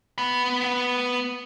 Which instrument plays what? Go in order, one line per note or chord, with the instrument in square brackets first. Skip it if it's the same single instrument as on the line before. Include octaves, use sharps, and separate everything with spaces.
[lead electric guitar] B3 B5